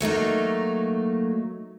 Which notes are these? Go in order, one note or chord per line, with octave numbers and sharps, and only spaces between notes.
F#3 A3 A#3 D#4